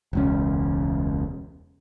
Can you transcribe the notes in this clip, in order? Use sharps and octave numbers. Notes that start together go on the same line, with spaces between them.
E1 C#2 C#4